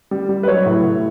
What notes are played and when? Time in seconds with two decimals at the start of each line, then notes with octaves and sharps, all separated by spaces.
0.11 G3
0.29 G3
0.43 B4
0.47 F#3 C#5
0.66 A2
0.84 A2